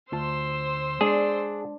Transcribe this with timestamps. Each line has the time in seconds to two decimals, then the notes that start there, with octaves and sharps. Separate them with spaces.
0.12 D2 F4 C5 A5 C6 E6
1.01 G#3 D4 G#4